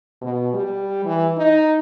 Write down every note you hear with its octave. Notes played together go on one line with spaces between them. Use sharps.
B2
G3
E3
D#4